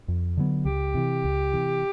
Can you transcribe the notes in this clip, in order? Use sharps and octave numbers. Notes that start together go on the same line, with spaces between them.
F2
D3 F#3 B3
C#2 G4
C3 E3
C#2
C3 E3